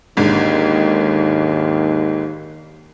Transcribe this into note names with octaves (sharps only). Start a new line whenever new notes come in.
G#1 D#2 G#2 D3